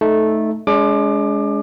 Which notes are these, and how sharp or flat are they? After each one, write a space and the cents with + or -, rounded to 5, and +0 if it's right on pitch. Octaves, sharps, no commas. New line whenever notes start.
A3 -10 D#4 +0 A4 -15
G#3 +5 D4 -45 D6 +25